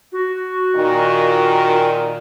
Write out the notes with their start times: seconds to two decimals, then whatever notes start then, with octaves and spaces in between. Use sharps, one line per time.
0.12 F#4
0.76 A#2 D#3